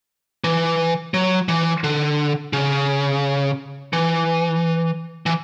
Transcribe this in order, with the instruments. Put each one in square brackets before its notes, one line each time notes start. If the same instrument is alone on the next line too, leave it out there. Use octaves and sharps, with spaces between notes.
[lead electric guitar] E3
F#3
E3
D3
C#3
E3
E3